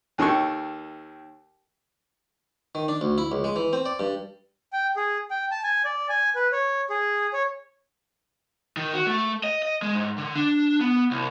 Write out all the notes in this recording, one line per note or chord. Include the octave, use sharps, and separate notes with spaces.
D#2 D#3 A4 C#6
D#3
D4
D2
E4
C#2
G#3
E3
C4
D5
G2
G5
G#4
G5
A5
G#5
D5
G#5
B4
C#5
G#4
C#5
D#3
F#4
A3
D#5
D#5
G#3
G#2
D3
D4
B3
C2